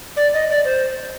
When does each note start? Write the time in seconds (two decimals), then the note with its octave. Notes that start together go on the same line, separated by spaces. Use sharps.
0.17 D5
0.34 D#5
0.50 D5
0.65 C5